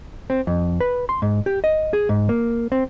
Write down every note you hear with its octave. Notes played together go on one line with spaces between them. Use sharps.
C4
F2
B4
C6
G#2
G4
D#5
G#4
G#2
A#3
C4